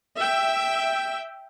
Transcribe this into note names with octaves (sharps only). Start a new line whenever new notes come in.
E5 G5